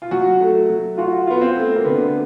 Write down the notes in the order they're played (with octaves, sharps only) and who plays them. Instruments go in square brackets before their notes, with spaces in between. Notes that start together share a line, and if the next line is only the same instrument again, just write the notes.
[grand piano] F4
[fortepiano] F#3 [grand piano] F#4
[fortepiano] A3
F#3
[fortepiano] F4 [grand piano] F#4
[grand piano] B3 [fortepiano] F4
[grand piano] C4
[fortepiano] A3
[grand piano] A#3
[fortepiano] D3 [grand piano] B3